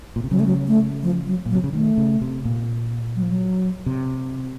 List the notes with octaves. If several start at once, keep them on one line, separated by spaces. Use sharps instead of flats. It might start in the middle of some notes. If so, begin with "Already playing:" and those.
A#2
C3
C#3 F#3
A3
F#3
A3
F3
F#3
A#2
F#3
C3
C#3
D#3 A3
C#3
C3
A#2
F#3
F3
F#3
C3